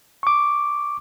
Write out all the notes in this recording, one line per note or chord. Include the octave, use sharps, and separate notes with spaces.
C#6 D6